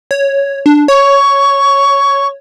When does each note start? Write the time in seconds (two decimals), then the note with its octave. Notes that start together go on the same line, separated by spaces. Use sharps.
0.11 C#5
0.66 D4
0.88 C#5 C#6